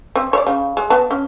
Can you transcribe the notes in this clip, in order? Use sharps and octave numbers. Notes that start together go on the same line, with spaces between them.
C4
C#5 D5
C#3
G#3
B3 A5
C#4